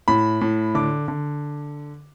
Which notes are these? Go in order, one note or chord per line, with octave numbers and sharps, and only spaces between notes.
A2 B5
A2
D3 D6
D3